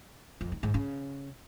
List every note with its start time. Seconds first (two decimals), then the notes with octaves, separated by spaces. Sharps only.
0.41 F2
0.52 D#3
0.63 G#2
0.74 C#3